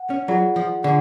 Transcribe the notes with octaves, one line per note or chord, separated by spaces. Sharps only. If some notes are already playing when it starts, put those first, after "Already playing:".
Already playing: F#5
C#4
F#3 F4 G#4 D5 F#5
F3
D3 F4 G#4 D5 F#5